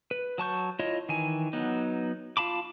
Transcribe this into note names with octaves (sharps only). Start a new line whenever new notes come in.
B4
F#3 A5 C#6 G6
E4 F4 C#5 D#5
D#3 E3 G#5
F#3 B3 D#4
F4 F5 A5 B5 D6